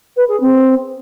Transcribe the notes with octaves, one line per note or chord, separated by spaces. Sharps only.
B4
G#4
C4